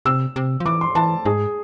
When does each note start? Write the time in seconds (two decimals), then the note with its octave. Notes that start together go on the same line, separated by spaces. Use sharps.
0.05 C3 E6
0.36 C3
0.60 F3
0.66 E3 D6
0.81 C6
0.95 E3 A5
1.25 G#2 G#4